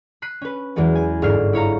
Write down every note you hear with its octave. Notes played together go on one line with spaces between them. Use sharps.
F#6 B6 C7 D#7
C#4 B4
E2 E3 F#3 G#3 B3
G#5
G1 G#2 F6 G#6 C7
E4 C#5 F5 A#5